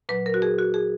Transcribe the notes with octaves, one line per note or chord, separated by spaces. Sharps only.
A#2 F#3 B4
A#4
F#4
G#4
F#4
G#4